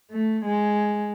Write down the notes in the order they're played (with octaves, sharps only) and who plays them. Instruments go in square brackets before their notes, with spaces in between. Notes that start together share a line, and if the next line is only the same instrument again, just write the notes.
[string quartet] A3
G#3